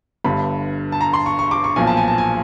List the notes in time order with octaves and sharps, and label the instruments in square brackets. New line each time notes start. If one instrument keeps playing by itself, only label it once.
[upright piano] G1 G2 D3 B5
A5
A#5
C6
C#6
C#6
D6
C#6
B1 A#2 F3 G#5
A5
G#5
A5
G#5